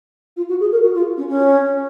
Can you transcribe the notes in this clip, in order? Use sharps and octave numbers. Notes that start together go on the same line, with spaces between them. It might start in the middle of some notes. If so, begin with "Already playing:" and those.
F4
F#4
G#4
A#4
F#4
F4
C#4
C#4